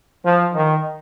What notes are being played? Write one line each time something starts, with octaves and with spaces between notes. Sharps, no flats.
F3
D#3